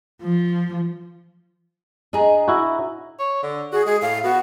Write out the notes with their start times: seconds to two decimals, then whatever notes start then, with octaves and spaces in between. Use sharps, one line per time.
0.22 F3
2.13 D4 G#4 D#5 A#5
2.48 E4 F#4
3.19 C#5
3.43 D3
3.73 F#4 G#4
3.86 G#3 G#4
4.02 A2 F5
4.24 B3 F#4